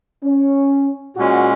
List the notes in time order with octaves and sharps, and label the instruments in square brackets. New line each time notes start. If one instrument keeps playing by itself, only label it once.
[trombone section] C#4
[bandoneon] A#2 G#3 C#4 [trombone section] F#4